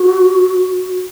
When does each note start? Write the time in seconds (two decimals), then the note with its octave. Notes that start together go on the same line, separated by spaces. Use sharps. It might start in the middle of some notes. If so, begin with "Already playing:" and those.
Already playing: F#4